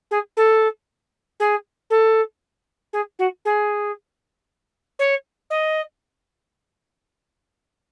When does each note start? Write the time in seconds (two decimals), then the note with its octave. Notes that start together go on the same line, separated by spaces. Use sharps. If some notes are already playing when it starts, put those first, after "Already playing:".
0.11 G#4
0.37 A4
1.40 G#4
1.90 A4
2.93 G#4
3.19 F#4
3.45 G#4
4.99 C#5
5.50 D#5